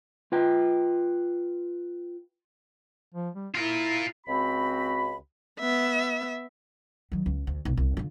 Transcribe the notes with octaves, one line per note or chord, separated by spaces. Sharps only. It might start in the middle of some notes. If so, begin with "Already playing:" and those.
F4 B4 G5
F3
G3
E4 F4 A#4
C#2 C4 F#4 B5
B3 E5
D#3 F#3
C#2
D2
B1
C2
D3 F4